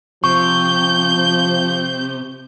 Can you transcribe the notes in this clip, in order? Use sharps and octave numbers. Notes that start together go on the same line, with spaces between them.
C3 F3 C#6 G6